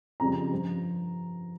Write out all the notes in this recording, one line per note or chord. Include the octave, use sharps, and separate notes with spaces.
F2 C#3 G3 A#5
G2 F3